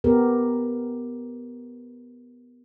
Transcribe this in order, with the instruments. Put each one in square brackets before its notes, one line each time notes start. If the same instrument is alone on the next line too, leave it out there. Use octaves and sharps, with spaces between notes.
[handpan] B3 G4 A#4